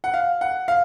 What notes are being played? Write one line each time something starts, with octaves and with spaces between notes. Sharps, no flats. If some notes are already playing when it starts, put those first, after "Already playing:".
F#5
F5
F#5
F5